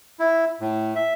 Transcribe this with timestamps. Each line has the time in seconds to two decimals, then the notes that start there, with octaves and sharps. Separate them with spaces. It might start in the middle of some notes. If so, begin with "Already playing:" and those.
0.19 E4
0.60 A2
0.95 E5